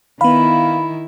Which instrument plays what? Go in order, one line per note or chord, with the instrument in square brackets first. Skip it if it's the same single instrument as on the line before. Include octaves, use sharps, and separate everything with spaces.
[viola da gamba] D#3 E4 [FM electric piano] B3 F5 [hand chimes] B5